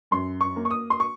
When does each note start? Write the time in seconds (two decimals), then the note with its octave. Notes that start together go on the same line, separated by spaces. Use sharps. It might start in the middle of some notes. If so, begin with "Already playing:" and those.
0.11 F#2 C6
0.41 C#6
0.56 A#3
0.65 C#6
0.70 D#6
0.90 C6
1.00 C#6